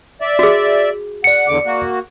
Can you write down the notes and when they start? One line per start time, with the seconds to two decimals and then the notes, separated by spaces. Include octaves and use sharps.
0.21 D5 E5
0.39 F#4 G#4
1.24 D5 F#5 C#7
1.48 E2 D3 D6
1.65 A#3 F#4